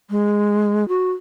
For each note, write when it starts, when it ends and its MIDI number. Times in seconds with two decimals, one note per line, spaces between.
0.10 0.87 56
0.88 1.10 66